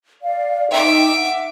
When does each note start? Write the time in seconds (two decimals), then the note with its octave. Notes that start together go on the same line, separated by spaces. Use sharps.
0.23 D5 F5
0.71 D#4 E5 G5 D6
1.15 F#5